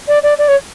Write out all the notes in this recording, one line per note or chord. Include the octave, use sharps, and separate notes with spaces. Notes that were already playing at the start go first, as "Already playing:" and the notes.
D5
D5
D5
C#5